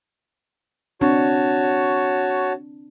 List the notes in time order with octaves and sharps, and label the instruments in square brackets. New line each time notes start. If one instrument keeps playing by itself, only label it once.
[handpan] C4 D4 [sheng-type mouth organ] F#4 C#5 A5